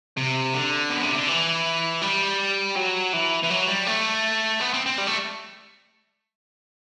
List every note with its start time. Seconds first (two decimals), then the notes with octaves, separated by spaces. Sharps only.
0.17 C3
0.54 D3
0.90 B2
1.03 C3
1.15 D3
1.28 E3
2.02 G3
2.76 F#3
3.13 E3
3.43 E3
3.50 F#3
3.68 G3
3.87 A3
4.61 B3
4.73 C4
4.86 C4
4.98 G3
5.07 A3